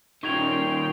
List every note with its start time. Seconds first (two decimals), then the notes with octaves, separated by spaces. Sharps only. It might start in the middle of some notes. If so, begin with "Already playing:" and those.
0.23 A#2 D#3 C#4 G5 C6 C#6 G#6 F7